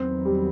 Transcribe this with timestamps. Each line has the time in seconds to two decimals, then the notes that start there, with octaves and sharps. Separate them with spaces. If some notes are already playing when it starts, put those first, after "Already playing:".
Already playing: E2 D#3 F#3 B3 C4
0.25 G3